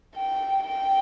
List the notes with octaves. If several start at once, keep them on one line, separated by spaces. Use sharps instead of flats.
G5
G5